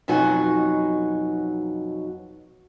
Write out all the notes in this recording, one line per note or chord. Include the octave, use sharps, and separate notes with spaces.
F2 B2 F#3 D#4 F#4 G#5